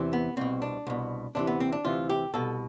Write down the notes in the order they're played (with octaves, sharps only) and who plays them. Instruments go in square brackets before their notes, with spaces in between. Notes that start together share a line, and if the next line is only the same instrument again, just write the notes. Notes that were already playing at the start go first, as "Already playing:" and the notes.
Already playing: [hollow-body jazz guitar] E2 C3 E3
B3
C2 B2 C4
D4
C2 B2
D2 C3 E3 D4
B3
C4
D4
D2 C3 E3 F4
G4
C2 B2 A4